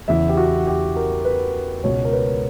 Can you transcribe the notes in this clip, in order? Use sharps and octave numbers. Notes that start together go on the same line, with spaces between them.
E2 C#3 E3 E5
G4
F#4
G4
A#4
B4
C#2 B2 C#5
A#4
B4